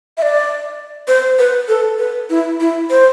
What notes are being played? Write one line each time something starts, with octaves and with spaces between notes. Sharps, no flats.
E5
D5
C5
B4
A4
B4
E4
E4
C5